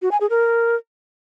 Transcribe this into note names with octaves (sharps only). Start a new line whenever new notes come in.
F#4
G#5
G#4
A#4